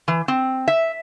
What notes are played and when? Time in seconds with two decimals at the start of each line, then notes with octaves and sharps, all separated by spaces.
0.08 E3
0.28 C4
0.68 E5